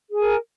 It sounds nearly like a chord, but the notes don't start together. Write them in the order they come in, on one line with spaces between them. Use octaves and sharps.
G#4 G#5 A#4